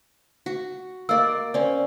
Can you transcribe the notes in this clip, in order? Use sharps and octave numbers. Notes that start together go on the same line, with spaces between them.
F#4
A#3 A#4 D5 D#5 E6
C4 C#4 D5